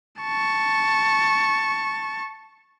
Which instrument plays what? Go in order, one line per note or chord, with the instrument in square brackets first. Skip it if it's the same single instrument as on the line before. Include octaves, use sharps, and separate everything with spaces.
[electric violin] A5 C#6